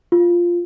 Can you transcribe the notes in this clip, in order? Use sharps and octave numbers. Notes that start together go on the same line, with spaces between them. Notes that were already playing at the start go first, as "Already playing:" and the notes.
F4